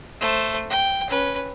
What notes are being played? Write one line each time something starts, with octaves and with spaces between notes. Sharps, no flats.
A3 C5
G5
C#4 B4